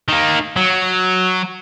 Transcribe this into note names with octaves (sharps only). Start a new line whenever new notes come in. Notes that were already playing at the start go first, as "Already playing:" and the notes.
D#3 A#3
F#3